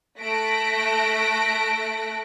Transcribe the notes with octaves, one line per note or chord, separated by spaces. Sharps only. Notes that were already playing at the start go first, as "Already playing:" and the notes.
A3 F#6 A#6 B6 D7